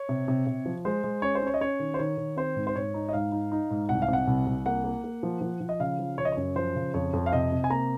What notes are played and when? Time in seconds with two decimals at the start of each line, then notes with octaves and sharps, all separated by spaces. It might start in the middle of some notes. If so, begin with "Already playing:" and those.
Already playing: C#5
0.09 C3
0.28 C3
0.47 C3
0.66 F3
0.85 G#3 C5
1.04 G#3
1.22 C#4 C#5
1.35 C5
1.42 C#4 C#5
1.54 D#5
1.61 C#4 C#5
1.79 D#3
1.94 C5
1.99 D#3 C#5
2.17 D#3
2.36 C4 C5
2.56 G#2
2.67 C5
2.75 G#2 C#5
2.94 D#4
3.09 D#5
3.13 G#2 F5
3.32 D#4
3.52 D#4
3.70 G#2
3.89 C2 F#5
4.02 F5
4.08 C3 F#5
4.27 C2
4.47 C2
4.66 A#3 F#5
4.84 A#3
5.04 A#3
5.23 F3
5.41 F3
5.61 F3
5.69 D#5
5.80 C#3 F5
5.99 F3
6.18 C#3 C#5
6.25 D#5
6.32 F#2 C#5
6.56 F3 C5
6.75 C#3
6.94 F2 C#5
7.13 F2
7.26 F5
7.33 C3 D#5
7.52 C3
7.64 G#5
7.70 A#3 A#5